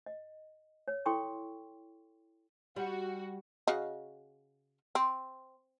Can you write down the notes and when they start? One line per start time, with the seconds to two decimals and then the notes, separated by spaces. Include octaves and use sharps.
0.06 D#5
0.88 C#5
1.06 E4 A4 G5 C6 C#6
2.76 G3 F#4
3.67 C#3 F#4 D#5
4.95 C4